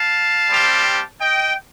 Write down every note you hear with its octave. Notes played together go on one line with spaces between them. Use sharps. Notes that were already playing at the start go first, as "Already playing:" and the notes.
Already playing: F5 A5
G3 C4 G4
D#5 G5